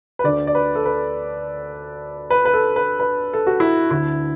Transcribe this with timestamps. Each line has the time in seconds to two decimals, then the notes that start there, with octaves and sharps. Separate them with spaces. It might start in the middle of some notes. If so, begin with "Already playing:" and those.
0.19 B4
0.24 D2 D3 D5
0.47 D5
0.55 B4
0.75 A4
0.85 B4
2.30 B4
2.45 B4
2.54 A4
2.76 B4
3.00 B4
3.34 A4
3.47 F#4
3.60 E4
3.91 D2 D3 E4